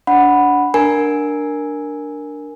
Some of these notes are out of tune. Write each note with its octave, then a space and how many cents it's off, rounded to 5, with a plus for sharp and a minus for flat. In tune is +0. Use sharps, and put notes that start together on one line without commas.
D4 -20 F#5 +0 B5 +0
D4 +0 A#4 +0 G#5 +0